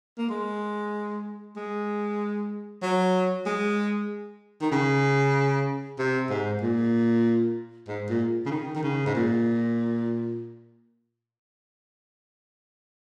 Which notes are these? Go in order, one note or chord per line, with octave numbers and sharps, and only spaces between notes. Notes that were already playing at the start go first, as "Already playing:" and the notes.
A#3
G#3
G#3
F#3
G#3
D#3
C#3
C3
G#2
A#2
G#2
A#2
C#3
D#3
D#3
C#3
G#2
A#2